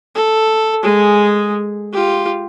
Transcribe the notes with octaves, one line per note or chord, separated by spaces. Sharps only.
A4
G#3 G#4
F4 G4